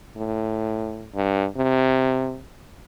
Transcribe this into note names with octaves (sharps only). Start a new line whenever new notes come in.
A2
G2
C3